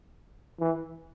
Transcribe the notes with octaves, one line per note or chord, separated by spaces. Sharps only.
E3